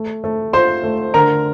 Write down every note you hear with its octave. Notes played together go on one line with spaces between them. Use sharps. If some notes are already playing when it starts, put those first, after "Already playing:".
Already playing: A3
A3
F4 C5 C6
A3
D3 A#4 A#5